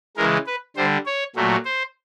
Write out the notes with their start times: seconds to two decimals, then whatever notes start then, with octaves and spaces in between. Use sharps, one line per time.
0.17 C#3 E3 G#3 A#4
0.47 B4
0.77 D3 G3 C5
1.06 C#5
1.36 A#2 F#3 A3
1.65 C5